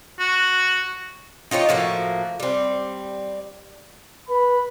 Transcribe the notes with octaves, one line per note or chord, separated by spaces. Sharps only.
F#4
D#4 F4 G4 C#5
A2 F3 A#3 F#4
G3 C4
B4 B5